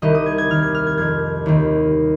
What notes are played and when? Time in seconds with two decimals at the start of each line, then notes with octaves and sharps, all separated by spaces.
0.02 C2 C3 D#3 D#5
0.15 D#6
0.26 G#6
0.38 G#6
0.50 D#2 D#3 F6
0.62 G#6
0.75 F6
0.87 G#6
0.98 F2 C3 D#3 G#6
1.46 D#2 D#3